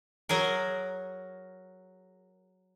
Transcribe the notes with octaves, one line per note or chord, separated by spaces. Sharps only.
F#3 G#4 A#4